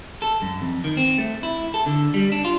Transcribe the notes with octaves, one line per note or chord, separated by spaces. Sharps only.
A4
F#2
F2
D#3
C4
A3
E4
A4
D3
G3
D4
F4